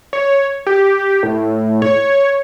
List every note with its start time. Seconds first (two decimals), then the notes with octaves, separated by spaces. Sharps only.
0.13 C#5
0.67 G4
1.23 A2
1.82 C#5